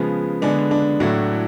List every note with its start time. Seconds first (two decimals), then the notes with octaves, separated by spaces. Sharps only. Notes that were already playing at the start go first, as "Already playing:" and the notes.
Already playing: C#3 F3 G#3 B3
0.42 D3 G#3 B3 D4
0.71 D4
1.00 A2 F#3 A3 D4 F#4